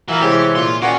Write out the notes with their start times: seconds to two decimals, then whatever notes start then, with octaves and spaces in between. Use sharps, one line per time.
0.08 A2 E3 F#3 B3 F4 A#4 F5
0.21 C3 G#3 G4 C5 C#5
0.56 A#2 F4 C6
0.82 D#3 A#3 C#4 F#4 G#4 B4 D5 F#5